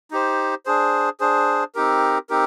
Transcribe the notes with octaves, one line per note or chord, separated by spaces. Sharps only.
D#4 G4 C5
D4 G#4 C5
D4 G#4 C5
C4 D#4 G4 A#4
C4 D#4 G4 A#4